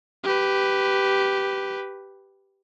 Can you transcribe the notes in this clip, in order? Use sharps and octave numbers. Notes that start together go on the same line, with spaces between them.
G4 B4